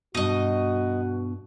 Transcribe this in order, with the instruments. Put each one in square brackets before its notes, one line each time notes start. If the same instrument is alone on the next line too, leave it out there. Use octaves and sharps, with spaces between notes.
[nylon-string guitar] G2 B2 [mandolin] D#4 D#5 [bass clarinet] F#4